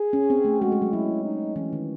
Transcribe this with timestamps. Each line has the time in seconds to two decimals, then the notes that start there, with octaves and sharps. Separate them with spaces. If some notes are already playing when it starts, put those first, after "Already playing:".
Already playing: G#4
0.13 C#4
0.30 C4
0.45 A3
0.62 G#3 F#4
0.72 G#3
0.82 F#3
0.93 F#3 E4
1.25 D#4
1.56 E3 C#4
1.73 D#3